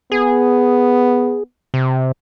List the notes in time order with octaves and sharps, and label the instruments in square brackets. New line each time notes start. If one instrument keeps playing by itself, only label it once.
[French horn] B3 [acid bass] G#4
[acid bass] C3